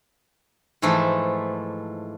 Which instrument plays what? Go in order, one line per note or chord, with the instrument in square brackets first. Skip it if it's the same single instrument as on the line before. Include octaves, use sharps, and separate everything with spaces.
[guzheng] G#2 E3 F3 A3 E4 F4